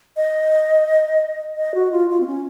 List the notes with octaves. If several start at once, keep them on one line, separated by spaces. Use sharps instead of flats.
D#5
D#5
F#4
F4
F4
C4
C#4